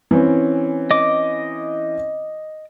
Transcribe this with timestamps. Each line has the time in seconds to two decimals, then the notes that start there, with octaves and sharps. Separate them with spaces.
0.11 E3 C4 C#4
0.91 D#5 D6